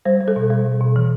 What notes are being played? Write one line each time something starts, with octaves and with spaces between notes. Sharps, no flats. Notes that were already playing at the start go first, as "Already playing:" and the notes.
G3 C5
G3
A4
B2
G3
B2
B2
E3